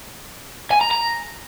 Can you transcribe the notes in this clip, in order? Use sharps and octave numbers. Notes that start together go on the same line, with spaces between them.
G#5
A#5
A#5